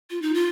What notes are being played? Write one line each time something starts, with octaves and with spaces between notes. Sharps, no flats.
F4
D#4
F4